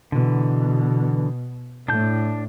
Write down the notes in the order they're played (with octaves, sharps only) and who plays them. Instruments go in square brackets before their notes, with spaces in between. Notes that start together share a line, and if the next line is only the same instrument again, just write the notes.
[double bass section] B2 [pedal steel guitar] D3 E3
[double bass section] A2 [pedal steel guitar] D4 A5 G6